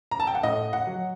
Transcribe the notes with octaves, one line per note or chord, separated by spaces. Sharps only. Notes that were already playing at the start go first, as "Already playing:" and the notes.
A#5
A5
G5
F#5
A2 D#5
F#5
F#3